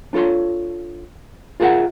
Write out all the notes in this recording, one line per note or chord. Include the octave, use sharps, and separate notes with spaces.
D4 F4 A4 C#5 C6
F4 G#4 A#4 E5 F#5